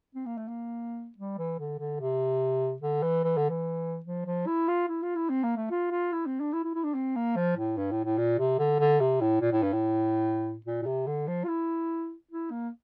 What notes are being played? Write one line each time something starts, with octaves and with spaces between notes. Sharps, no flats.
C4
A#3
A3
A#3
G3
E3
D3
D3
C3
D3
E3
E3
D3
E3
F3
F3
E4
F4
E4
F4
E4
C4
A#3
A3
F4
F4
E4
C4
D4
E4
E4
E4
D4
C4
A#3
F3
A2
G2
A2
A2
A#2
C3
D3
D3
C3
A2
A#2
A2
G2
A2
A#2
A#2
C3
D3
F3
F4
E4
E4
A#3